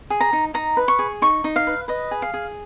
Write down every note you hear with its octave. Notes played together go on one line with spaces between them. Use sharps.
G#4
A#5
D#4
D#4 A#5
B4
C#6
G#4
D#4 C#6
D#4
F5
B4
B4 D#5
G#4
F5
G#4